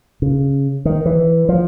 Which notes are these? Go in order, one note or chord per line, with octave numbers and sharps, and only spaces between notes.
C#3
D#3
E3
F3